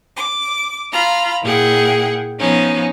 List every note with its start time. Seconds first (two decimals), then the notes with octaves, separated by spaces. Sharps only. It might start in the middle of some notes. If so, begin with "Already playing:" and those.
0.16 D6
0.91 F4 A#5 B5
1.42 A#2 E4 G#4 F#5 G5
2.39 F3 B3 C#4 D#4